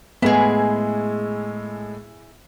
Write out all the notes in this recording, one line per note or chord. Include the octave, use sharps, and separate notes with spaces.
A2 G#3 B3 E4 G#4